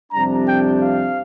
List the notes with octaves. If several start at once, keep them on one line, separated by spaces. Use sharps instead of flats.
F2 C3 G3 D4 A#5
G5
F5